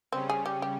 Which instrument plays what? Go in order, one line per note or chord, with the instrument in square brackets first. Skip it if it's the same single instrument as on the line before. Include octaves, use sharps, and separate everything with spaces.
[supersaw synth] C#3 G3 C#4 [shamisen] C4
[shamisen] G#4
G4
G4